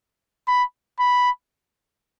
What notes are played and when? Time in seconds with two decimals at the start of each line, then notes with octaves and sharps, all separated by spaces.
0.48 B5
1.00 B5